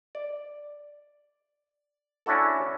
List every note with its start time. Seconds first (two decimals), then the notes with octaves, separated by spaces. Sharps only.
0.15 D5
2.26 C#4 D4 E4 F#4 A4